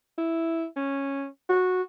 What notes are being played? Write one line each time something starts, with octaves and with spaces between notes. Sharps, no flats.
E4
C#4
F#4